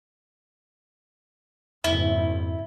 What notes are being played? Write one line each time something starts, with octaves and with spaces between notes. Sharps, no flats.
F#1 F2 G#2 E4 E5